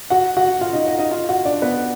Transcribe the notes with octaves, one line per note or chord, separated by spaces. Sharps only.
F#4 F#5
F#4 F#5
F4 F5
D#4 D#5
D#4 D#5
D#4 D#5
F4 F5
F#4 F#5
D4 D5
B3 B4